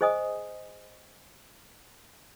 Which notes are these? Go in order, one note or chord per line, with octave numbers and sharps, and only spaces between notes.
G#4 C5 D#5 G#5 D#6